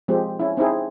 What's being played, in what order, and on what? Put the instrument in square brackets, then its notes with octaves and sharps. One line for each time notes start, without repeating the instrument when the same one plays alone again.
[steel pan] F3 G#3 C4 G4
C#4 E4
C4 D#4 E4 G#4